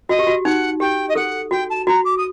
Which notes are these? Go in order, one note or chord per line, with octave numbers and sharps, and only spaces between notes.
F#4 D#5
G4
F#4
D#4 F#5
G4 G5
D#5
A4 F#5
F#4 G5
A5
F#4 A#5
D6
D#6